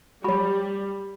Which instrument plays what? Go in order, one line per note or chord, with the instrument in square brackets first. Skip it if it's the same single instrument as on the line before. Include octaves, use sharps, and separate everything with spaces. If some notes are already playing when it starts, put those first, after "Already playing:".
[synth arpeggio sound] F#3 F#4 [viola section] G3 [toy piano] B5